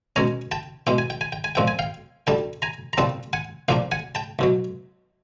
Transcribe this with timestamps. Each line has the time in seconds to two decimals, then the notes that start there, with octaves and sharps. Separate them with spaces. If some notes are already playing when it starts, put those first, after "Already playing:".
0.16 B2 G#3 C#4 G#5 A#5
0.52 G5 A5
0.87 E2 B2 G#3 G5
0.98 G#5
1.10 G5
1.21 G#5
1.32 G5
1.44 G#5
1.55 A#2 F3 G#3 C4 G5
1.68 G#5
1.79 F5 G5
2.27 D2 D3 G3 G5 A5
2.62 G#5 A#5
2.93 A#5
2.98 C2 A#2 G3 C4 G5 A5
3.33 F#5 G#5
3.69 C2 A#2 F3 A#3 D4 F5 G5
3.92 F#5 G#5
4.15 G5 A5
4.39 C2 B2 F#3